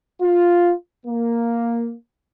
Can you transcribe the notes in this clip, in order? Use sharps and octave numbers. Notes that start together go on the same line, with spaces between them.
F4
A#3